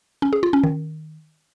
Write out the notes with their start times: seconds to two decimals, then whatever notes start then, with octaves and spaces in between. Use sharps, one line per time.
0.22 C#4
0.33 G#4
0.43 F4
0.53 C#4
0.64 D#3